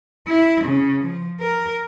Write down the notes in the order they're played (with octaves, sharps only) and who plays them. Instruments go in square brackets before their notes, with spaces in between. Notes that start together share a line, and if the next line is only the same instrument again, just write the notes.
[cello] E4
C#3
F3
A#4